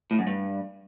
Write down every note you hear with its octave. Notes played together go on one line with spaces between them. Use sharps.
A2
F#2
G2